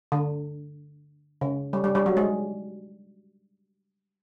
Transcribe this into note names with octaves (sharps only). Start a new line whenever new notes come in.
D3
C#3
G3
G3
G3
F#3
G#3